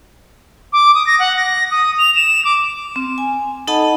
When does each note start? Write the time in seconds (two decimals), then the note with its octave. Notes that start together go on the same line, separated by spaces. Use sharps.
0.73 D6
0.95 D#6
1.06 A#6
1.19 F#5
1.37 A#6
1.71 D#6
1.98 F7
2.16 E7
2.45 D6
2.96 C4
3.18 G#5
3.67 D#4 A4 D#5 F#5 A5 B5